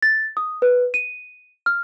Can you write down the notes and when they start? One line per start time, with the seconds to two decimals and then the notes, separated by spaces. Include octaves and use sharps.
0.03 A6
0.37 D#6
0.62 B4
0.94 D#7
1.66 F6